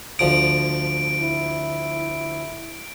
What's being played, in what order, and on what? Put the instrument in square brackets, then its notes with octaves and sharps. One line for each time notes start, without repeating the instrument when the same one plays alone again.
[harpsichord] D2 F3 D#6 [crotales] D7
[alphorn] E4